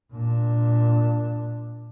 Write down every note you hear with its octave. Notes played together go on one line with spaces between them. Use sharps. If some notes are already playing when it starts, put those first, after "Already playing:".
A#2 D4